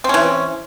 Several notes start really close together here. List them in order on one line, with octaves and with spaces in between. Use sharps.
C4 C#4 E3